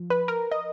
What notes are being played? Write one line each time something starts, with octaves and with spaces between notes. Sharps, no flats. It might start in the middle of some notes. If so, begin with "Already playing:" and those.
Already playing: F3
B4
A#4
D#5